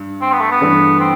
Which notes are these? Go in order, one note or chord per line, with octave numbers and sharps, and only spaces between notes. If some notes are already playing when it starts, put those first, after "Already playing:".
Already playing: G2
C4
B3
A3
B3
G2 E3 A3 D4
C4